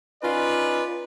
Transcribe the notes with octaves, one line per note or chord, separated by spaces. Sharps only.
C#4 D#4 F4 B4 D5